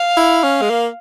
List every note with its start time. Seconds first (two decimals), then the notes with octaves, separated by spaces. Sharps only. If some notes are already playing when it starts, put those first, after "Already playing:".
Already playing: F5
0.17 E4
0.43 C#4
0.61 G#3
0.70 A#3